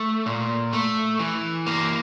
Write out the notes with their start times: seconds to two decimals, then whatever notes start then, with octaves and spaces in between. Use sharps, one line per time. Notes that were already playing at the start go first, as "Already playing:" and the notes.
Already playing: A3
0.26 A#2
0.73 A3
1.19 E3
1.67 A#3